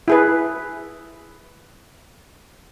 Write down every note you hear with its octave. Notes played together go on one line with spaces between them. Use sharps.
E4 G#4 B4